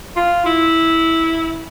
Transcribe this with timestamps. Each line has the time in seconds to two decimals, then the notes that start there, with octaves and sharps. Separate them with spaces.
0.16 F4
0.46 E4